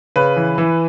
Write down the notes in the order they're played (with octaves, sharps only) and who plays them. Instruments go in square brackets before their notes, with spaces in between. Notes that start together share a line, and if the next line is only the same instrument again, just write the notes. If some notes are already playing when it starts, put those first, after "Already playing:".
[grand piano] C#3 B4
E3
E3